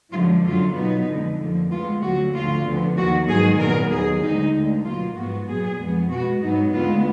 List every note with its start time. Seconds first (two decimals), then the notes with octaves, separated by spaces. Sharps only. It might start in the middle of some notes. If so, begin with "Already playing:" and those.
0.13 F#2 D3 F3 G#3 F4
0.45 F#2 D3 F#3 F4
0.76 B2 F#3 B3 D#4
1.08 F2 D3 G#3
1.39 F2 D3 F3 A#3
1.71 D2 D3 G#3 B3 F4
2.02 D2 D3 F#3 A#3 F#4
2.33 D2 D3 F3 A#3 F4
2.65 D2 D3 F3 B3
2.97 D#2 D#3 A#3 F#4
3.27 G#2 D#3 F#3 B3 G#4
3.59 A#2 F#3 B3 A#4
3.90 D#2 D#3 F#3 G#4
4.22 D2 D3 G#3 D#4
4.54 D2 D3 G#3
4.85 B2 F#3 A#3 F4
5.16 G#2 F3 B3 F#4
5.48 A#2 F#3 B3 G#4
5.79 F2 F3 G#3 B3
6.10 B2 G#3 B3 F#4
6.42 G#2 F#3 B3 D#4
6.73 D2 D3 G#3 B3 F4